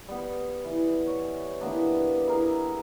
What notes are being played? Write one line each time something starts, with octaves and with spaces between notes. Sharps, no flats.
G3 B3
E3
C#5
E3 A#3 B3 D4
E4 G#4 A#4 G#5